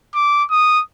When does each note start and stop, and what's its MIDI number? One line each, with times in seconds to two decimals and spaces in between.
0.14 0.44 86
0.50 0.81 87